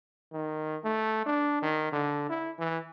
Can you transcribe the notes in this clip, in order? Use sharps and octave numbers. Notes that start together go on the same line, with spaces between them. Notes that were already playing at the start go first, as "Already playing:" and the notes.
D#3
A3
D4
D#3
D3
E4
E3